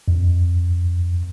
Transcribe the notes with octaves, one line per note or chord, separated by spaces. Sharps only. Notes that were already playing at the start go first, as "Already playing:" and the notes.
F2